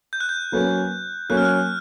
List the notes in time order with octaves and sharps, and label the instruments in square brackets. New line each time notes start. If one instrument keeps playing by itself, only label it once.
[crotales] G6
F#6
G6
[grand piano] F#3 A#3 C#4 F#4 B4
[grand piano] F#3 A#3 C#4 [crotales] F#6
[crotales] F6
F#6